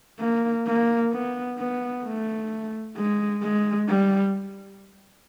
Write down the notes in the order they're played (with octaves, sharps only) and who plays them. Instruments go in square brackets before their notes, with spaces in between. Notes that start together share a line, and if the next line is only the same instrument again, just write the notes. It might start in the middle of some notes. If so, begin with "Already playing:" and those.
[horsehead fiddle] A#3
A#3
B3
B3
A3
G#3
G#3
G3